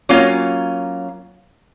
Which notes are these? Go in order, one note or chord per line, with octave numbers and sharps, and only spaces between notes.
F#3 A#3 C#4 F4